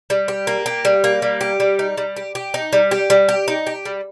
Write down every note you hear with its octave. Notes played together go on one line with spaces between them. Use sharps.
G3
G4
A#3
G4
G3
A#3
G3
G4
G3
D#4
G3
G4
G4
D#4
G3
G4
G3
G4
D#4
G4
G3